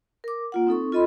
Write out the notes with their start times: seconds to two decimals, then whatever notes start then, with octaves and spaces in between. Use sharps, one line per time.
0.24 A#4 D6
0.52 A#3 F4 F#5
0.67 C4 D#4 A4 C#6
0.92 F4 A4 D#5 B5 C6